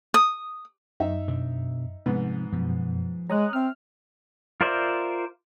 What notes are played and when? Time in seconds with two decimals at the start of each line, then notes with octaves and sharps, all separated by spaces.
0.14 D#6
1.00 F#2 D#4 E5
1.28 B2 D4
2.06 G#2 C3 F3 B3
2.53 F#2 B2 F3
3.30 G#3 C#5 A#5 D#6 F#6
3.53 C4 E5 F6
4.61 F4 A#4 C5 D5 E5